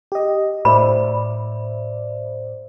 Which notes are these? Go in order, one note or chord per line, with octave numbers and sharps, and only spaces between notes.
G4 D#5
A2 C5 D5 E5 B5